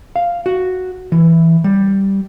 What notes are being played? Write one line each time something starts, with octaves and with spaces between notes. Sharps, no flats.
F5
F#4
E3
G3